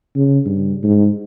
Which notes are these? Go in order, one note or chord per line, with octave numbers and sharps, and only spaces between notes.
C#3
G2
G#2